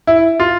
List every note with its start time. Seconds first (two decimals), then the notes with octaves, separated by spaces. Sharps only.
0.07 E4
0.40 F4